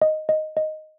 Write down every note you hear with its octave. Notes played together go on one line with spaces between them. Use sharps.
D#5
D#5
D#5